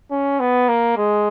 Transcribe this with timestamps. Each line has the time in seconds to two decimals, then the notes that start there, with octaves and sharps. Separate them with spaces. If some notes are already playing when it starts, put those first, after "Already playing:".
0.11 C#4
0.40 B3
0.69 A#3
0.97 G#3